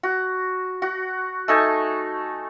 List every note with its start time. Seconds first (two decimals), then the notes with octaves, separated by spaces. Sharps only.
0.03 F#4
0.82 F#4
1.48 A3 D#4 G#5